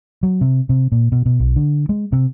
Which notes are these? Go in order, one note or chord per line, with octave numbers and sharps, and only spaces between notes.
F#3
C3
C3
A#2
B2
B2
B1
D3
G#3
C3